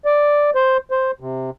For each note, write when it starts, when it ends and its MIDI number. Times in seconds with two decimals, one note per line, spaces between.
0.05 0.50 74
0.55 0.77 72
0.91 1.11 72
1.20 1.50 48